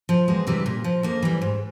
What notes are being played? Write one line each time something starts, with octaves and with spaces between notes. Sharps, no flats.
F3
E2 G#3
C3 E3 G3
A#2
F3
F2 A#3
E3 G3
G#2